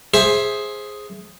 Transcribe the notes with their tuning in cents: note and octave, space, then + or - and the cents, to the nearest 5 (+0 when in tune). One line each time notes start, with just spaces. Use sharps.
G#4 +0 C5 +15 E5 +0